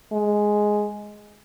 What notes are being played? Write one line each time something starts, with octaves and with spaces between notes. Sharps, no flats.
G#3